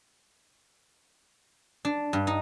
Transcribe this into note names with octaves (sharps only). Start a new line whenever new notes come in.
D4
G2
D#4